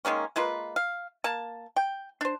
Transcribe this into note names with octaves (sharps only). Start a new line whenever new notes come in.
D#3 G#3 A#3 C#4
G#3 A#3 F4 B4
F5
A#3 A5
G5
D4 C5